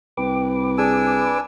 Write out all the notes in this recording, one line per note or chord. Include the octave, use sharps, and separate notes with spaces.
C2 B4 G5 D6
D4 G#4 G#5 E6